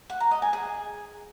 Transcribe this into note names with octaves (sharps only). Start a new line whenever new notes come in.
F#5
A#5
D#5
G#5
G#4